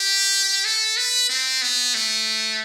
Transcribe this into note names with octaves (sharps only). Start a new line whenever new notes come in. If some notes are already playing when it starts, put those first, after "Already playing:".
Already playing: G4
A4
B4
C4
B3
A3